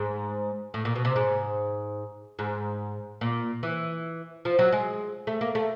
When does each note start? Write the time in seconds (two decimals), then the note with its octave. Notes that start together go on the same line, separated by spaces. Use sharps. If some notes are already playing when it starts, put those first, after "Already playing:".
Already playing: G#2
0.74 A2
0.85 A#2
0.96 B2
1.05 C3
1.16 G#2
2.39 G#2
3.21 A#2
3.63 E3
4.45 F3
4.59 F#3
4.72 G#3
5.27 A3
5.41 A#3
5.55 A3